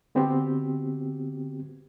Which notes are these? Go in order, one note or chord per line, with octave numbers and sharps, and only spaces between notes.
D3 B3 C4 F#4 G4